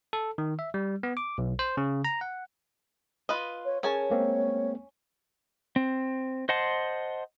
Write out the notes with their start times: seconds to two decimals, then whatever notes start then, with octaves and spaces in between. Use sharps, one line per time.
0.13 A4
0.38 D#3
0.59 E5
0.74 G3
1.03 B3
1.17 D6
1.38 B1
1.59 C5
1.77 C#3
2.05 A#5
2.21 F#5
3.29 F4 B4 D#5
3.65 C#5
3.83 C#4 G#4 A#4 C#5 G#5 A5
4.10 G#3 A#3 C4
5.76 C4
6.49 C5 D#5 F#5 A5 C6